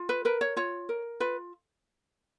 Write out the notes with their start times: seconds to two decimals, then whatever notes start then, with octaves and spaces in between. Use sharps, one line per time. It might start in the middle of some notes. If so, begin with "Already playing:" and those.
Already playing: F4
0.09 B4
0.25 A#4 B4
0.41 C#5
0.56 F4 C#5
0.89 A#4
1.20 F4 B4